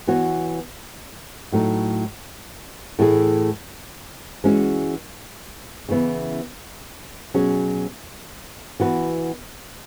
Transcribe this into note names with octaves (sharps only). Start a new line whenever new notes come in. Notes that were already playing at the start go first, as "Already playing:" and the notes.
E3 B3 F#4 C#5
A2 F#3 A3 D#4
A2 E3 A3 E4 G#4
E3 G#3 C#4 F#4
C#3 E3 B3 E4
B2 F#3 C#4 G#4
E3 B3 F#4 B4